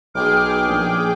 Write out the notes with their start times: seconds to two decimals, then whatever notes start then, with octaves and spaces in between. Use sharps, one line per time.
0.15 B1 G#4 G5 D6 F6
0.68 A#1